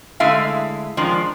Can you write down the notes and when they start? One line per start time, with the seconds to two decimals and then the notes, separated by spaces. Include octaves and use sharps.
0.20 D3 G#3 A3 E4 E5 F5
0.97 D#3 F3 G#3 D4